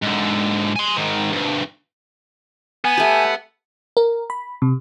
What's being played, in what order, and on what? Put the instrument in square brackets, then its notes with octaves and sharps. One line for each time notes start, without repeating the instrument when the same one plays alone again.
[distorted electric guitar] G#2 D3
G#5 C6
G#2 D#3
D2 G2
[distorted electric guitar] B3 [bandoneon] G#5
[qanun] A3 G4
[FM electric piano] A#4
B5
C3